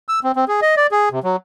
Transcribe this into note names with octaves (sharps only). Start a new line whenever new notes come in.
E6
C4
C4
G#4
D#5
D5
G#4
C3
F#3